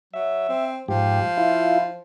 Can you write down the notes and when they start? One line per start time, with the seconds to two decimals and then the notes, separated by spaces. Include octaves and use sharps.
0.14 F#3 E5
0.49 C4
0.88 G#2 F3 G4
1.38 E4 F4